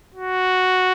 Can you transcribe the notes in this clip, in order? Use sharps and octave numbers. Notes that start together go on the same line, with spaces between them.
F#4